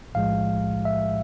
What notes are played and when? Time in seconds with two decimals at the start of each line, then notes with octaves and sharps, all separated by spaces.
0.14 B1 A2 F3 G#3 F5
0.85 E5